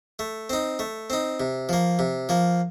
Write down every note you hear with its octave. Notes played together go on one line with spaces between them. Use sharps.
A3
C4 D#4
A3
C4 D#4
C3
F3 A#3
C3
F3 A#3